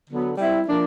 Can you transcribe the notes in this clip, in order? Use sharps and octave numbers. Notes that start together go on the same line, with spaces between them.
D3 F#3 B3
G3 C4 E4
F3 A#3 D4